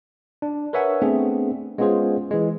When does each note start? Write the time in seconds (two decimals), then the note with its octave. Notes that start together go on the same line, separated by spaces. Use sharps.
0.42 D4
0.73 A#4 B4 C#5 E5 F#5 G#5
1.02 A3 B3 C4 D4 G#4
1.78 G#3 B3 C#4 F4 G#4 C5
2.31 E3 G#3